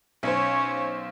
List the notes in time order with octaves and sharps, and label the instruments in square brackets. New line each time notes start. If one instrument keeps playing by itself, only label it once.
[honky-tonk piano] B1 C5 [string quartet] C#4 C#5